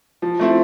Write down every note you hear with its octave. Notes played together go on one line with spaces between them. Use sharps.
F3
A3 C4 E4